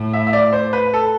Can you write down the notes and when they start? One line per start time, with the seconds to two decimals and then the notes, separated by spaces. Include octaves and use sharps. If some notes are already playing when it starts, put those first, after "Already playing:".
Already playing: A2
0.13 E5
0.27 E5
0.33 D5
0.53 C5
0.73 B4
0.94 A4